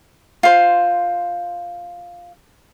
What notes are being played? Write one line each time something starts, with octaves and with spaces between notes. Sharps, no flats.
F4 C5